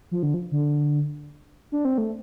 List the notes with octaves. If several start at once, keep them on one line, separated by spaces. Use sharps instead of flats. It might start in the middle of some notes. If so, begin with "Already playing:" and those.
F3
D3
F3
D3
D4
C4
A3